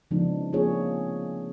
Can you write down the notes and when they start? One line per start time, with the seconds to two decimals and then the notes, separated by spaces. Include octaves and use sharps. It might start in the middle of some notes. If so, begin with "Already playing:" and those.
0.11 C#3 F3 G#3 B3 D4 D#4
0.53 A#3 C4 F4 G#4 C#5